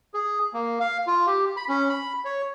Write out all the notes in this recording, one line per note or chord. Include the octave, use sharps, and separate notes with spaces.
G#4
A#3
F5
F4
G4
B5
C#4
B5
C#5